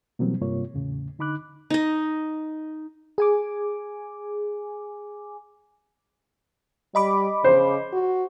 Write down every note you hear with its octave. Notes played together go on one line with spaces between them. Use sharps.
B2 E3 F#3 G3 A#3 C4
G2 C3 A#3 F4 C#5
E2 A2 C#3
D3 D#4 B5 D6 F#6
D#4 D#5
G#4 G#5 D6
G3 D#5 B5 D6
C#3 C5
F#4